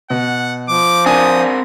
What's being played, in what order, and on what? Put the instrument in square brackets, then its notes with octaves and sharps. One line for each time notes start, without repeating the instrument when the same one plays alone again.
[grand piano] B2 [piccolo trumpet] F#5
[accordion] F3 [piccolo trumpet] D6
[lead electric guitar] C4 A#4 [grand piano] D4 G#5 [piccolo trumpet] D#6